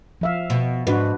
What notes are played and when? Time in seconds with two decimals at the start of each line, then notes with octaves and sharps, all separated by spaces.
0.21 F3 E5 F5
0.50 B2
0.87 G#2 D4 F#4 B4